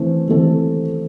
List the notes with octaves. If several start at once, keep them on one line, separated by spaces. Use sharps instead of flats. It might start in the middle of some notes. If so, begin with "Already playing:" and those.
Already playing: E3 A3 C4 A4
E3 A3 C4 A4